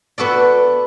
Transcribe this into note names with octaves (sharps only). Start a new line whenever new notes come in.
B3 F#4 A4 D5